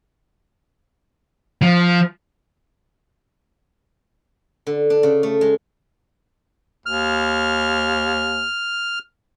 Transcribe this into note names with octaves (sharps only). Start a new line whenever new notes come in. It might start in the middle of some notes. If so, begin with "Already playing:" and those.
F3
D3
D4
C#3
A3
G#3
D#2 F6